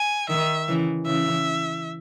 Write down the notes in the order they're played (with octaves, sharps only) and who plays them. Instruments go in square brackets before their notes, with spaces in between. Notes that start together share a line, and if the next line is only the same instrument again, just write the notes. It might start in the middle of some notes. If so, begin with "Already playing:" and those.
Already playing: [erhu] G#5
[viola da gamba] D#3 [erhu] E5
[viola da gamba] C#3 E3
[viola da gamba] C#3 E3 [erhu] E5